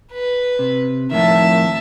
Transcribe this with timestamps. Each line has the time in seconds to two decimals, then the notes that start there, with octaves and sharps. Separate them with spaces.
0.12 B4
0.59 C3
1.11 F2 A2 D#3 E5 A5